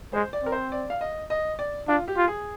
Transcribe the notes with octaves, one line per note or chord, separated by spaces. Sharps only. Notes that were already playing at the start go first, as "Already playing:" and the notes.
G#3 C5
D5
C4 A#4
C5
D5
F5
D#5
D#5
D5
D4 F4
G4
F4
G#4